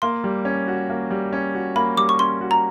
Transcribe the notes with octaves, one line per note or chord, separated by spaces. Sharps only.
A#3 C6
G3
C#4
F#4
A#3
G3
C#4
F#4
A#3 B5
G3 D6
C#6
C#4 C6
F#4
A#5